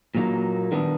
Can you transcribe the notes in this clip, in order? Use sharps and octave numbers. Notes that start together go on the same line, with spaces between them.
A#2 F#3 A#3 D#4
D#3 G3 B3 D4